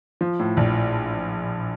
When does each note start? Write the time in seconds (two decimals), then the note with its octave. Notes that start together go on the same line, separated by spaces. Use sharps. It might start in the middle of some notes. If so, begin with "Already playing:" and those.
0.21 F3
0.39 A2
0.57 A#1